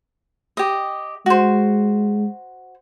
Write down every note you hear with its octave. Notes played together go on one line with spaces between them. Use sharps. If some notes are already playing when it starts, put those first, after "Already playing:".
G4 D#5
G#3 F#4 C5